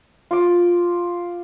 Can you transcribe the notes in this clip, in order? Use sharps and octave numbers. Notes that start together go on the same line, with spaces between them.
F4 D6